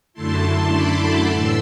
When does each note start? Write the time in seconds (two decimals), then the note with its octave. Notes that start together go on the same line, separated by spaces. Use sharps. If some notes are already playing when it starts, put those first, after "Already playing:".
0.13 F#2 D3 A3 E4 A5 C6
0.71 B5 D6
1.29 A2 E3 C6 E6